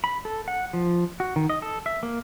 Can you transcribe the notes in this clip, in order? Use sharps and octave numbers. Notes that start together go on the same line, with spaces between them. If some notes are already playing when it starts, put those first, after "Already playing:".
B5
A4
F#5
F3
F#4
D#3
D#5
A4
E5
A#3